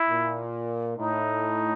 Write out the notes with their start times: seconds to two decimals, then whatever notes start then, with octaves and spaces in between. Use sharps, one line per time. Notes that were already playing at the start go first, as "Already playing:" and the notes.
Already playing: E4
0.08 A#2
0.97 A2 D#4